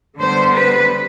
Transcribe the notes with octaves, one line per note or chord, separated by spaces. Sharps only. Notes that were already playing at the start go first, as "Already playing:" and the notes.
D3 G3 B3 C5
B4